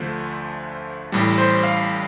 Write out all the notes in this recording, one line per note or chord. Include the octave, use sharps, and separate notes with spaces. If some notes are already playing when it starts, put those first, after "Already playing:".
Already playing: D2 D3 F3 A3 C5
A1 A2 G3
C5
F5